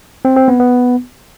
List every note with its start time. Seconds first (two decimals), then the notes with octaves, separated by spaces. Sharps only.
0.25 C4
0.36 C4
0.48 B3
0.60 B3